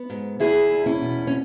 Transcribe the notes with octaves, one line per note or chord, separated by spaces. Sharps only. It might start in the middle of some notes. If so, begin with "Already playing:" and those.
Already playing: B3
G#2
E2 E4 G#4
E2
C#4 E4
B2
C#4